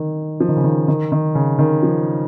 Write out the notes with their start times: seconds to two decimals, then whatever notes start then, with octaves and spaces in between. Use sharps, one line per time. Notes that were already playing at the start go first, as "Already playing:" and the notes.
Already playing: D#3
0.40 F3
0.48 D#3
0.56 C#3
0.64 D#3
0.88 D#3
1.12 D#3
1.35 C#3
1.59 D#3
1.83 F3